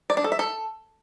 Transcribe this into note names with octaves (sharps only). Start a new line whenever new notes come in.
D5
D4
A4
E5
A4